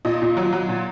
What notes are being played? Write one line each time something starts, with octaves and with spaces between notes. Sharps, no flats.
A#2 D#5
A#2
F#3
F#3
A#2